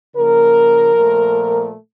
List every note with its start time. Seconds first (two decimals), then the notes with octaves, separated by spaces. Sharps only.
0.16 C#3 F3 A#3 A#4
0.95 A#2 F3 A3